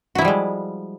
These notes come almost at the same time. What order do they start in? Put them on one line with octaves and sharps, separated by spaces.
F#4 E4 F3 G3 G#3